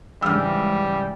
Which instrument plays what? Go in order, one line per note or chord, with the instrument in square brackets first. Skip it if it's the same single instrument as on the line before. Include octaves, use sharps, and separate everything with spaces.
[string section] G#2 C#3 E3 [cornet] G3 [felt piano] E6 F6